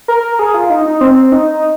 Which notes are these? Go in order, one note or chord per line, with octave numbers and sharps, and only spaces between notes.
A#4
G#4
F4
D#4
D#4
C4
D#4